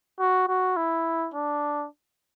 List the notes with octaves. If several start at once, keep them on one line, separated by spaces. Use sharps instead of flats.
F#4
F#4
E4
D4